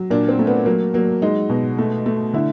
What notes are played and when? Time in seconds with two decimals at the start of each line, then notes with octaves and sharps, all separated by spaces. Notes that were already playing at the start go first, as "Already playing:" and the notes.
Already playing: F#3
0.10 A#2 D4
0.29 C4
0.39 A3
0.47 B3
0.66 F#3 A#3
0.94 F#3 A#3
1.22 G#3 D#4
1.50 B2
1.78 A3
2.06 A3
2.33 D3 E4